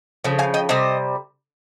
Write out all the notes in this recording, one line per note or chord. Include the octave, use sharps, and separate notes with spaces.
C#3 F3
F5 G#5
D#5 G5
C3 G3 C5 D#5